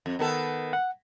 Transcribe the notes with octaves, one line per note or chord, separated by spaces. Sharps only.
F2
D#3 B3 A4
F#5